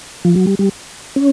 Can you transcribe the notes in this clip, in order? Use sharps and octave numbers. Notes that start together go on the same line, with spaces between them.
F3
F#3
G3
G3
C#4